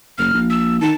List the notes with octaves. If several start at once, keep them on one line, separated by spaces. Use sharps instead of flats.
F#1 F6
A#1
E6
D#3 A5